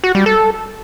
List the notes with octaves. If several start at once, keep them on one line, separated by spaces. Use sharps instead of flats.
F#4
G3
A4